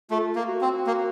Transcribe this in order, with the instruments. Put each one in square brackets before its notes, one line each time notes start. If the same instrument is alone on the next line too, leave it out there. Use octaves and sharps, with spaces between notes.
[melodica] A3 [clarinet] F4
[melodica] A#3
[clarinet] F#4
[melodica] C4
A#3